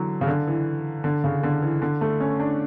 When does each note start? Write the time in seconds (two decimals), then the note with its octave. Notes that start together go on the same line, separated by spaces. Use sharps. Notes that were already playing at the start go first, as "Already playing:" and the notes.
Already playing: D3 E3 F#3
0.21 C#3
0.27 D3
0.47 E3
1.04 D3
1.24 C#3
1.43 D3
1.62 E3
1.82 D3
2.01 A3
2.20 C#4
2.40 D4